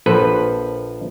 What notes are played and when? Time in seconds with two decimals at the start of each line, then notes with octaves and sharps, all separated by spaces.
0.06 A#1 F3 A4 B4 C5